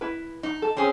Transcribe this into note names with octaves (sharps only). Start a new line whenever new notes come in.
E4 B4
D#4
A4
C4 C#4 G#4